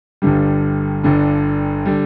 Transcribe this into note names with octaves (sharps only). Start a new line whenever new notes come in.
G1 G2 D3 G3
G1 G2 D3 G3
D3 G3